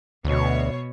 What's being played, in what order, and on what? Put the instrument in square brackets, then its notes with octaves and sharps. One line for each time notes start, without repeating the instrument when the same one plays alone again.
[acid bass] D2 [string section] B2 C#5